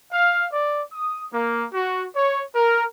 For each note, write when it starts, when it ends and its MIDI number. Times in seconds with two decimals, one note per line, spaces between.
0.11 0.46 77
0.51 0.82 74
0.92 1.25 87
1.32 1.66 58
1.73 2.06 66
2.15 2.41 73
2.55 2.85 70